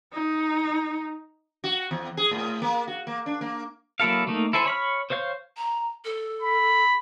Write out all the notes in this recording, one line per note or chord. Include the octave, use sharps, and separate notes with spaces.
D#4
F#4
E2
G#4
A2
A#3
F#4
A#3
D4
A#3
F#3 A#3 E4 A4 F5
A3 A#3 D#4
E4 A4 C5 G#5
C#5 B5 F6
C5 C#5 F5 G6
A#5
A4
B5